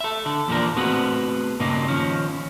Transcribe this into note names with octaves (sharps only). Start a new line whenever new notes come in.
A4 E5
D3 A4
E2 A#2 F3 A#3 D4 A#4
A3 B3 C4 F#4 G#4
G2 A#2 C#3 A#3 D#4
D#3 F3 C#4